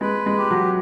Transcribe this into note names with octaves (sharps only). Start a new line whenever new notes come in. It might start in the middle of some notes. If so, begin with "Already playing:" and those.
G#3 B4
G#3
G4
F#3